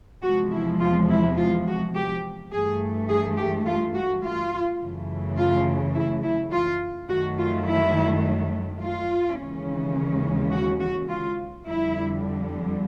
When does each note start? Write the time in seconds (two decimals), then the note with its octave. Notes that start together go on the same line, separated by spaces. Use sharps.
0.23 E2 C3 F3 G#3 F#4
0.52 E4
0.80 F4
1.09 E4
1.37 F4
1.67 F#4
1.95 G4
2.52 G2 E3 A3 G#4
3.09 G#4
3.38 G4
3.66 F4
3.95 F#4
4.24 F4
4.80 F#2 C#3 E3 A3
5.38 F4
5.95 E4
6.23 E4
6.52 F4
7.09 F#2 D#3 F#3 A3 F#4
7.38 F4
7.66 E4
8.80 F4
9.37 D#2 C#3 E3 G#3 C#4
10.51 F#4
10.80 F#4
11.09 F4
11.66 F2 D3 G3 E4